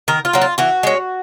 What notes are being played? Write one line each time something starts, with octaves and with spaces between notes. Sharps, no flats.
D#3 A#4
F4
F#3 A#3
F4
E3 F#4
G#3 C#4